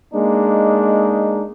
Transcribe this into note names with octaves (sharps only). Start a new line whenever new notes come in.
G#3 A#3 D4 D#4